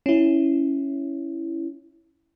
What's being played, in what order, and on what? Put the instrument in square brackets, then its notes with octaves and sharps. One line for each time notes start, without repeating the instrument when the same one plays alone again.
[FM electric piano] C#4 E4